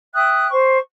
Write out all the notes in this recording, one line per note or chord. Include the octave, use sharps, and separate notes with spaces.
E5 G5 D#6 F#6
C5 C#6